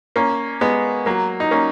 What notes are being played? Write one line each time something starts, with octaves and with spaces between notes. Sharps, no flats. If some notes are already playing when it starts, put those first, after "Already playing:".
A#3 C#4
G#3 B3
F#3 A#3
D#4
A#3 C#4